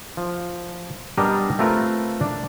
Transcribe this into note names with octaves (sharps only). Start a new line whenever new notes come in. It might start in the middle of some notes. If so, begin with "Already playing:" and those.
F3
G3 B3 D4 A#4 D#5 A#5
A3 C4 F4 A#4 B4
D4